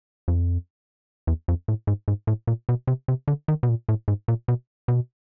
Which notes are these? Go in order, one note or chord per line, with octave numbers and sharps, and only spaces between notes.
F2
E2
F2
A2
G#2
G#2
A2
A#2
B2
C3
C3
D3
D#3
B2
A#2
A2
G#2
A#2
B2
B2